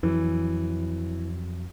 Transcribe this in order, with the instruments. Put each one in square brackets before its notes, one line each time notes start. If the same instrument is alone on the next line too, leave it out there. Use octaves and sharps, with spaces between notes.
[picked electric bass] F2 F#3 [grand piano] E3